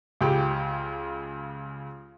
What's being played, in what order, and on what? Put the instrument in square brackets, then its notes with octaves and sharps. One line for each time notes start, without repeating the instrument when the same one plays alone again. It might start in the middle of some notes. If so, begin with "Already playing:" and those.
[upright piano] C#2 C#3 G4